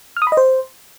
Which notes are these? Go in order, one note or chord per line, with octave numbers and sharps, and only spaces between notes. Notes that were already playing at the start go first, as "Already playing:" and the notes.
F6
D#6
B5
D#5
C5